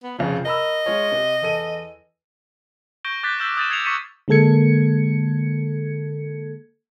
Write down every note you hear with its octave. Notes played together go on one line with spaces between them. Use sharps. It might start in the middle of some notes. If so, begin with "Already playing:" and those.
B3
F1 F2 C#3 F4
A#4 D#5 B5 E6
G#3 F4 C#5
C3
E2 A4 D#7
C#6 G6 A#6 D7 G7
D6 F#6 G6 A6 B6
E6 F6 G6 A#6 B6 E7
D#6 G6 A6 D#7 E7
D#6 G#6 C7 C#7 E7 F7
C#6 A6 B6 C#7 D#7 E7
D3 G#3 A#3 A4 G#6 C#7